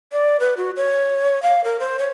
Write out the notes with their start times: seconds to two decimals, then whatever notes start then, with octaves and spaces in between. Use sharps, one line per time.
0.12 D5
0.40 B4
0.57 F#4
0.77 C#5
1.43 F5
1.64 A#4
1.80 C5
1.99 C#5